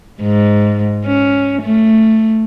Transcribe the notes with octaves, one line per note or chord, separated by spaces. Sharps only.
G#2
C#4
A3